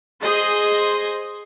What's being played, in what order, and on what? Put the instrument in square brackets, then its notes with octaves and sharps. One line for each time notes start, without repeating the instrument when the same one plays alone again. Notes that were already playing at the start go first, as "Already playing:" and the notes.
[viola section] G#4 C5 D#5